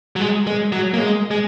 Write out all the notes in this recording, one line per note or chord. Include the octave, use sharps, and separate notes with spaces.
F#3
G#3
G#3
F#3
A#3
G#3
G#3